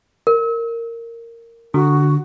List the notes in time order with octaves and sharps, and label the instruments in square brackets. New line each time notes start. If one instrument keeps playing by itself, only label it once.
[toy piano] A#4
[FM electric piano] D3 [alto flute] F#4